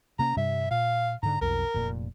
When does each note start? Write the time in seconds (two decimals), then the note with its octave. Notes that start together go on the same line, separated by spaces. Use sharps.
0.19 C3 A#3 C#4 A#5
0.37 G2 C3 G3 E5
0.71 A#2 F5
1.23 G#2 D3 A#5
1.41 B1 F2 A#4
1.74 F1 A#2